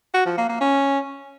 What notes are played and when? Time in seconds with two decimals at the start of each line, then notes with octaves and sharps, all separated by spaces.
0.14 F#4
0.26 F3
0.37 A#3
0.49 A#3
0.61 C#4